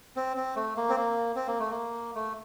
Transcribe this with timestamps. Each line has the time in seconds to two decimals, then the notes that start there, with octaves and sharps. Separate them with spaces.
0.16 C4
0.37 C4
0.56 A3
0.77 A#3
0.89 C4
0.96 A#3
1.36 C4
1.47 A#3
1.60 A3
1.71 A#3
2.15 A3